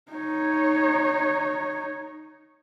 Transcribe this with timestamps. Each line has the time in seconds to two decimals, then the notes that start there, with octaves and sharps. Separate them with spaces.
0.12 D#4 C#5